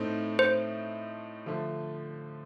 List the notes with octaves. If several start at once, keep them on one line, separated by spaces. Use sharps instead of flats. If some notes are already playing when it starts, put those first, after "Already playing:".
Already playing: A2 A3 C4 D#4
C5
D3 F3 A3